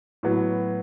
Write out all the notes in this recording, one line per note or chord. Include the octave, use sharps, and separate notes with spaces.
A2 F#3 B3